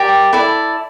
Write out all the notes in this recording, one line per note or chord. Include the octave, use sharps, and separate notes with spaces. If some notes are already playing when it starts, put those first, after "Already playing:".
Already playing: G4 A#4 D5 D6
E4 A4 D5